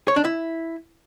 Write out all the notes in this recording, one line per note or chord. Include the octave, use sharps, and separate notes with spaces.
C#5
D4
E4